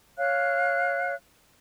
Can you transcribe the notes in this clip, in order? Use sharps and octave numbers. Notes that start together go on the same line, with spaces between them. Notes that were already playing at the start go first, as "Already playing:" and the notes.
C#5 F5 F#6